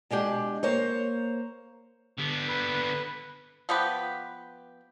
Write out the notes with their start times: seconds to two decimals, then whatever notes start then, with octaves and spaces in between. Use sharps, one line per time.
0.11 B2 G#3 D4 G4
0.63 A#3 C5 C#5
2.18 D3 B3
2.48 B4
3.69 F3 B3 G4 B4